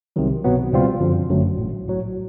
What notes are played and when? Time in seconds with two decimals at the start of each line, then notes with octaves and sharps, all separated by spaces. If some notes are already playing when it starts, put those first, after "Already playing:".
0.16 C2 C3 D#3 F#3
0.44 B1 B2 F#3 B3
0.73 C#2 B2 G3 C4 F4
1.01 F#2 D3 F3
1.29 G#1 F#2 D3 F#3 A3
1.58 A1 A2 F#3
1.86 A#1 A2 F#3